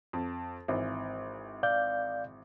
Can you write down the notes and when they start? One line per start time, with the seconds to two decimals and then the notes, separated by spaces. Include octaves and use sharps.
0.13 F2
0.68 G#1 E3
1.63 D5 F5 G6